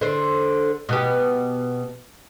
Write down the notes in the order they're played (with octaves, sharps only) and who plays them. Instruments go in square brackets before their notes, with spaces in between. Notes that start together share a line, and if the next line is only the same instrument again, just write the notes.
[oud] D3 C5
B2 B3 G4